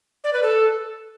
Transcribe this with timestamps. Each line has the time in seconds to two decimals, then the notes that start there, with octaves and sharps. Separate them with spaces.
0.24 D5
0.33 B4
0.43 A4